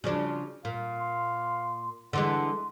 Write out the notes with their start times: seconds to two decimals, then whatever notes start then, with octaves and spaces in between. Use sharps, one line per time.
0.04 C#3 F3 D4 F#4
0.65 A#2 F5
1.00 C6
2.13 D3 E3 G#3 F#5 C6